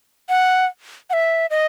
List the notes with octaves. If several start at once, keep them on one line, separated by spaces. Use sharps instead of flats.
F#5
F#5
E5
D#5